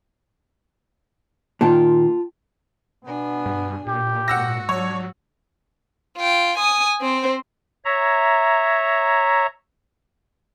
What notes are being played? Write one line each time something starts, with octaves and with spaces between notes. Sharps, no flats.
A#2 D#3 F4 G5 A5
B2 B3 D4 G#5
G2
A#2 G4
G#2 F#4 F#5 E6 A#6
F#3 D4 C#5
F4 G5
G#5 D#6
C4 C5
C#5 E5 A#5